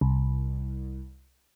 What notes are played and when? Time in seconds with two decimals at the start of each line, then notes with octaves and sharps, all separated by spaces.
0.01 C2